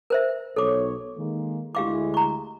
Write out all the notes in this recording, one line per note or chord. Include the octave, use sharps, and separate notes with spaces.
A#4 C5 E5
B1 A4 C#5 D6
D#3 G#3 A#3
D2 G#3 E4 G4 F5 D6
A#5 C#6